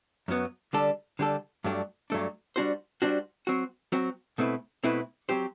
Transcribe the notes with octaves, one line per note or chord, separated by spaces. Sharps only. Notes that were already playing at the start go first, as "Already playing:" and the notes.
F#2 F#3 B3
D3 G3 D4 A4
D3 G3 D4 A4
G2 F#3 A3 D4
G2 F#3 A3 D4
G3 D4 F#4 C5
G3 D4 F#4 C5
F#3 C4 F#4
F#3 C4 F#4
B2 A3 C4 E4 B4
B2 A3 C4 E4 B4
F#3 C4 G4 C5